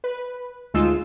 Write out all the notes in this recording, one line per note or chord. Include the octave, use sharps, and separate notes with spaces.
B4
D2 G#3 D#4 F4 E6